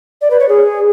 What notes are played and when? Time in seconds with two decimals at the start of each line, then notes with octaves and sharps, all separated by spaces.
0.21 D5
0.30 B4
0.40 C#5
0.49 G#4